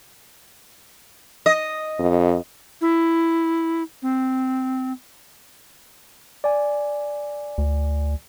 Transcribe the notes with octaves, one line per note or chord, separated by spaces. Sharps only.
D#5
F2
E4
C4
D5 G#5
D2